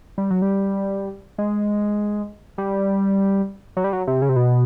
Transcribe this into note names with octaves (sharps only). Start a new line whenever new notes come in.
G3
F#3
G3
G#3
G3
F#3
G3
F#3
C3
C#3
C3
B2